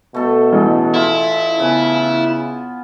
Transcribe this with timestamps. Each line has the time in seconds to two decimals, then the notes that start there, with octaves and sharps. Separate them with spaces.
0.14 B2 A3 A4
0.52 A1 G#4
0.94 E4 F4
1.59 C#3 B3 G#5